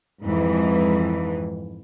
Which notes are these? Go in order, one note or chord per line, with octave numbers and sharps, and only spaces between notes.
F2 G#2 E3